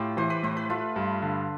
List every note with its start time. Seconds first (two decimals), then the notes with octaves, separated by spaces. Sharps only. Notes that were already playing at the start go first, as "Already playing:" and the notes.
Already playing: A2 F4 G4
0.17 E3 C5
0.30 B4
0.43 A2 C5
0.57 B4
0.69 A3 F4
0.96 G2
1.22 D3